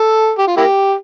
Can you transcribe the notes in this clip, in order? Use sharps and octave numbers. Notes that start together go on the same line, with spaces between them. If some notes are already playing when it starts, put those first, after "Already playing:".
Already playing: A4
G4
F4
A#3 E4 G4